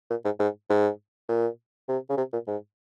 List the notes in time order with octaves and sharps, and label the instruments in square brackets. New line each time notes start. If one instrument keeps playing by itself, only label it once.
[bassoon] A#2
G#2
G#2
G#2
A#2
C3
C#3
C3
A#2
G#2